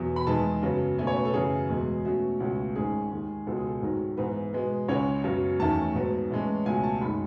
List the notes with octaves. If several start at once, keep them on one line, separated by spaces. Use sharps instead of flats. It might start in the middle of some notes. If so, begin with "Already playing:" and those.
Already playing: E2 B2 F#3 B3
B5
E2 D#3 G#3 B3 A5
F#2 C#3 F#3 B3
B2 A3 C#4 G#5
C#5
B4
A4
F#2 C#3 E3 G#4
E2 B2 G#3 B3
B2 A3 C#4 F#4
C#2 B2 A3 C#4
G#2 D#3 G#3 C#4 G#4
D#2 D#3 G#3
C#2 B2 G#3 A4
G#4
A4
G#2 D#3 F#3
G#2 E3 B3 B4
B2 G#3 B3
C#2 C#3 G#3 C#4 C#5
F#2 C#3 F#3 B3
E2 D#3 A3 C#4 A5
G#2 F#3 B3
A2 E3 G#3 C#4
C#2 B2 A3 C#4 G#5
A5
F#2 D#3 G#3 B5